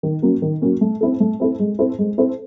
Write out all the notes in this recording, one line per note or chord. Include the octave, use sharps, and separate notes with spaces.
D#3
F#3 A#3 C#4
D#3
F#3 A#3 C#4
A3
C4 E4 A4
A3
C4 E4 A4
G#3
C4 E4 A4 C5
G#3
C4 E4 A4 C5